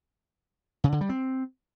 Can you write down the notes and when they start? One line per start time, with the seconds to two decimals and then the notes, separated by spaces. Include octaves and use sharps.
0.84 C#3
0.92 D3
1.01 G3
1.09 C4